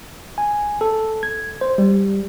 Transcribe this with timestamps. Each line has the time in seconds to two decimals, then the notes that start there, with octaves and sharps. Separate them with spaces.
0.38 G#5
0.81 A4
1.23 G#6
1.61 C5
1.78 G3